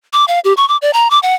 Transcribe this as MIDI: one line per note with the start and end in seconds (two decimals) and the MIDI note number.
0.13 0.25 86
0.28 0.40 77
0.44 0.53 67
0.57 0.67 85
0.69 0.77 86
0.82 0.91 74
0.93 1.10 82
1.10 1.19 86
1.23 1.35 78